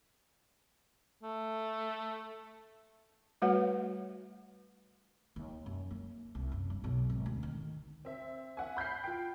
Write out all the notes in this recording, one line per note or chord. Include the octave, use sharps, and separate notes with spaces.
A3
G3 A3 F#4 B4 C#5 F#5
D#2
F#2
A#3
C2
F#1
G2
B1
G#1
D2
D#3
C4 E5
E5 F#5 G#5
B5 G6 B6 C7
F4 G5